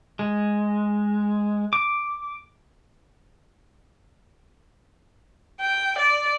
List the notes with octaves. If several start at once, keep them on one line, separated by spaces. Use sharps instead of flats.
G#3
D6
G5
D5